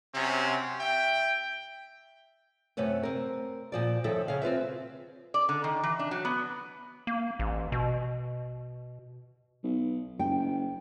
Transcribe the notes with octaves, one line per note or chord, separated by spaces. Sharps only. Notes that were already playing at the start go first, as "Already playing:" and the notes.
C3 F#3 C#4
E5 G5
F#2 C3 A3 B4 C#5
C4 A#4
A#2 F3 D5
F#2 D#3 F3 E4 A4 E5
C#3 F5
C4 F4 B4 E5
D5
D3
D#3
E3
D4
F#3
B3
A#3
A1
B2
B1
F#1 G5